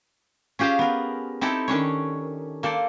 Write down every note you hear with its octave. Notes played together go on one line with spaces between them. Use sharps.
C#4 F4 G4 G#4 C5 F5
B3 A#4
C4 D#4 E4 G4 A4
D#3 C#4 D4 C#5
A#3 A4 C5 D5